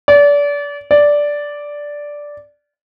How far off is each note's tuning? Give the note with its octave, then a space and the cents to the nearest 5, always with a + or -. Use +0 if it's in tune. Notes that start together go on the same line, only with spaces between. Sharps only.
D5 -30
D5 -5